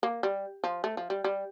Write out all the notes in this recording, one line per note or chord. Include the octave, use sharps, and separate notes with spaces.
A#3
G3
F3
A3
F3
G3
G3